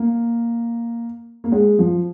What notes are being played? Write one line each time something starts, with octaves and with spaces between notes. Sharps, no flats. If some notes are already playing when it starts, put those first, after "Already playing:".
Already playing: A#3
A#3
G#3
F3